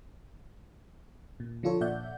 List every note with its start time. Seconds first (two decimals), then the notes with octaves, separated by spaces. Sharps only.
1.40 A#2
1.63 D3 F3 D4 F4 A4 C#5
1.81 A#2 D5 E5 F#5 G6